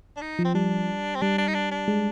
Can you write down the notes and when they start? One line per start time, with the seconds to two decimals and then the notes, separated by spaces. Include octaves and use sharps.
0.16 D4
0.21 D#4
0.39 F3
0.45 C4
0.54 G3 D4
1.16 C4
1.22 G3 D4
1.38 D4
1.48 D#4
1.54 D4
1.71 D4
1.88 G#3